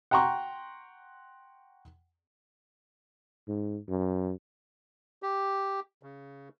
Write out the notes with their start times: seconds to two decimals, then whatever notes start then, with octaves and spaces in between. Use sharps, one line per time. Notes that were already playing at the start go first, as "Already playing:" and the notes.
0.11 F#5 G5 A#5 C6 C#6
3.48 G#2
3.89 F#2
5.23 G4
6.03 C#3